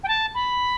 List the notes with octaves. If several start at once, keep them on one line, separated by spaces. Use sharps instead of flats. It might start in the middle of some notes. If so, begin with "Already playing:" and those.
G5
A5
B5